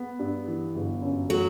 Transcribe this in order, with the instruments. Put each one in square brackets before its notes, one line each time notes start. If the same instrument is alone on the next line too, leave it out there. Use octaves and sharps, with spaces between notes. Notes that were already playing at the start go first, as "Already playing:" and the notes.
Already playing: [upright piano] B3
G2
E3
G1
F#2
[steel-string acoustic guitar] F#3 [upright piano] A3